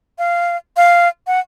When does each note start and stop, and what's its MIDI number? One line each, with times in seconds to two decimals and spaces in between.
0.19 0.57 77
0.77 1.08 77
1.27 1.40 78